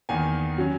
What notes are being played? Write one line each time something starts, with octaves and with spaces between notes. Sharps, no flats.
E2 D#3 A#3 G#5
F#3 C#4